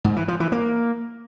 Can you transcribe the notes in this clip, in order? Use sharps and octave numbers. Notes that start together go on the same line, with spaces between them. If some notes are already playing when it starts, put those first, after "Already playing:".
G#2
E3
F3
E3
A#3